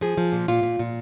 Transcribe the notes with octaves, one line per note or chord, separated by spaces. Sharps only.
F3 G#4
F3
A#2
A#2 F4
A#2
A#2